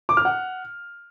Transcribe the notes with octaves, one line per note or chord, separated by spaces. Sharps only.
D6
F6
F#5